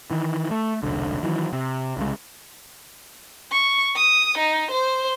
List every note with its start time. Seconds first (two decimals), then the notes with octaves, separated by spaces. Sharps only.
0.11 D#3 E3
0.51 A3
0.83 E1 C2 D3
1.23 D#3 E3 F#3
1.53 C3
1.97 C2 C#3 G#3
3.52 C#6
3.96 D#6
4.38 D#4
4.71 C5